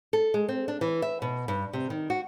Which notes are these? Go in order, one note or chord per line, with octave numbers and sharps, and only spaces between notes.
A4
G#3
C4
D4
E3
E5
B2
G2
C3
D#3
F#4